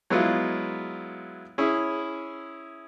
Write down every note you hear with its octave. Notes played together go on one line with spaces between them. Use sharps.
F#3 G#3 B3 E4 F4
C#4 E4 G#4